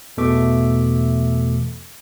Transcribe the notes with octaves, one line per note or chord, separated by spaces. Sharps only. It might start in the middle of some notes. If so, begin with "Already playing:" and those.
E2 B2 E3 A3 E5 D6